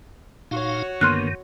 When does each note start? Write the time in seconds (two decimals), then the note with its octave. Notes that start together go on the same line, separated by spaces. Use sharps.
0.51 A#2 D#4 F#4 C#5 F5
1.01 G2 D3 D#3 A#3 B3 C6 F6 F#6